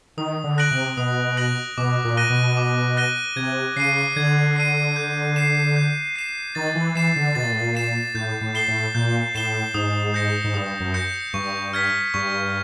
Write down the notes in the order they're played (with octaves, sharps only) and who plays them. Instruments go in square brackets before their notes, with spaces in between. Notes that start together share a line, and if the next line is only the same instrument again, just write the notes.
[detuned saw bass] D#3 [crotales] D#6
[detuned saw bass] D3
[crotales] F#6 A#6 D7 F#7
[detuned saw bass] C3
[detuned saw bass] B2 [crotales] D#6
[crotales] F#6 A#6 D7 F#7
[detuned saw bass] B2 [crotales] D6
[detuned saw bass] A#2
[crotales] F#6 A#6 D#7 G7
[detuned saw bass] B2
[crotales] D6
F#6 A#6 D#7 G7
[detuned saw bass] C3 [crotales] G#6
[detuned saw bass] C#3 [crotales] C7 D#7
[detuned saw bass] D3 [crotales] G#6
[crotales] C7 D#7
G6
C7 E7
G6
C7 E7
[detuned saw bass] D#3 [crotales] A6
[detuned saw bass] E3
[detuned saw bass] E3 [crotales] C7 E7
[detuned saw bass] D3
[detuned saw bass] B2 [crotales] A6
[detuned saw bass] A#2
A2
A#2
[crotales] C7 E7
[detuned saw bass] A2 [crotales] G6
[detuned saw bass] A2
[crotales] C7 E7 G7
[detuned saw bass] A2
[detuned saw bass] A#2 [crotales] G6
[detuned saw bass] A2 [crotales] C7 E7 G7
[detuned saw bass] G#2 [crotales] D#6
[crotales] G6 A#6 C#7
[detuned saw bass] G#2
[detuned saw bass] G2 [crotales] D#6
[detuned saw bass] F#2
[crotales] G6 A#6 C#7
[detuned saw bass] G2 [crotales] C#6
[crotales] F6 G#6 B6
[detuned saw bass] G2 [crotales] C#6